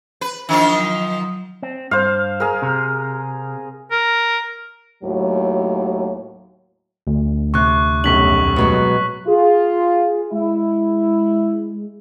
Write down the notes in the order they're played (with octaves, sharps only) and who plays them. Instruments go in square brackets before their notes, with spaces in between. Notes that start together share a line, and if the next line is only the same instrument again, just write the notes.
[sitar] B4
[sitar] D#3 F3 F4 [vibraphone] D4
[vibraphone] F#3 D#6
[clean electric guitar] C4
[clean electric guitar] G2 [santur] C5 F5
[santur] G#4 A#4
[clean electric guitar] C3
[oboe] A#4
[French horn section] D#2 A2 F#3
[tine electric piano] D2
[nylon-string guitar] C3 [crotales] C#6 F#6
[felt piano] F1 B1 F#2 [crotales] C#6 B6 F#7
[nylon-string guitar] B2 F#3 G#3
[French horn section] F4 [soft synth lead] G#4
[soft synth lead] G#3 [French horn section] E4